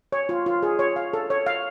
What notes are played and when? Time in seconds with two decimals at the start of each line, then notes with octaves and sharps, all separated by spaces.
0.12 C#5
0.29 F4
0.46 F4
0.63 G#4
0.79 C#5
0.96 F5
1.13 A4
1.30 C#5
1.46 F5